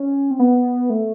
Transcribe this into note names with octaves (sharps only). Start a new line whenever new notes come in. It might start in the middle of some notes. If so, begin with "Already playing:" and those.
Already playing: C#4
C4
B3
A3